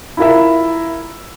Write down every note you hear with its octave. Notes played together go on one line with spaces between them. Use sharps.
E4 F4 A#4 E5